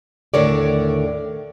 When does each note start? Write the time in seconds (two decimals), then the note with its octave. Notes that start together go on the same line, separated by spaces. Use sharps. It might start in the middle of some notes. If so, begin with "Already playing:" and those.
0.34 D#2 A2 D3 A#4 C#5 D5